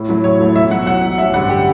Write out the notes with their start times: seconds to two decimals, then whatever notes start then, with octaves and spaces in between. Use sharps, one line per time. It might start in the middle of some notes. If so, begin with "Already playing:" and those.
Already playing: A2
0.09 F#3 A3 E4
0.24 A2 C#5
0.40 F#3 A3 E4
0.56 B1 E5
0.71 B2 F#3 F#5
0.87 B1 F#5
1.02 B2 F#3
1.18 A1 E5
1.34 G2 D3 F#5
1.50 G4